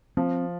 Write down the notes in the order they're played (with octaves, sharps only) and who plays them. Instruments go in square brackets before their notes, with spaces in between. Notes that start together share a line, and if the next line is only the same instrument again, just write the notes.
[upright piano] F3 [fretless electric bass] C4